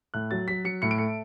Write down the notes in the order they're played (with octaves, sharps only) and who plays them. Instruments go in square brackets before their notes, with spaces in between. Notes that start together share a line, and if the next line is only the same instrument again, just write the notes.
[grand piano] A2 F#6
F#3 A6
F#3 B6
F#3 C#7
A2 C#7
D7
A3 C#7